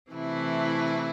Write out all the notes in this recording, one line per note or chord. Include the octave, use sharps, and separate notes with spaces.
C3 E3 A3 E4